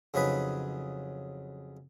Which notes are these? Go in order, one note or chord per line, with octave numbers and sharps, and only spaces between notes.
F2 C#3 F#3 D#4 B4 B5